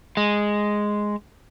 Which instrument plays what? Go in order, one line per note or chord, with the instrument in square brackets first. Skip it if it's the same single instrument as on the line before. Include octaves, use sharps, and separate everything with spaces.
[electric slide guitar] G#3